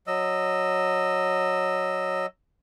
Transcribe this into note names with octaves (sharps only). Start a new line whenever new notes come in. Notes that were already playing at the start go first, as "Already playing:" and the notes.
F#3 D#5 E6